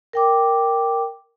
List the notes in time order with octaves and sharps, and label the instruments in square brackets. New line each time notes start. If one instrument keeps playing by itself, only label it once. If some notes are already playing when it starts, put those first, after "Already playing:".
[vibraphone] A#4 G5 D6